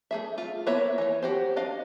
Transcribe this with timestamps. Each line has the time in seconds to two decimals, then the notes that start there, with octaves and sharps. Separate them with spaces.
0.11 A3 G#4 E5
0.38 F4
0.67 A#3 B3 E4 C#5 E5
0.98 E3 C#5
1.22 F#4 G4 C5
1.56 D4 D#5 F5